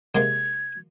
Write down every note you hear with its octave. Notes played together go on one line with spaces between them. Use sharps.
C3 G#3 A#3 G#6